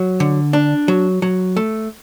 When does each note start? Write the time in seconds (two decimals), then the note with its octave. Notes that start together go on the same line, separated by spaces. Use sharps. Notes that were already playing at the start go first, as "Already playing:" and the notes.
Already playing: F#3
0.20 D3
0.53 D4
0.88 F#3
1.22 F#3
1.57 A3